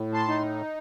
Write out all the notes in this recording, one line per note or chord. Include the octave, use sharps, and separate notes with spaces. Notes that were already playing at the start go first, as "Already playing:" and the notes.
Already playing: A2
A5 C6
D#4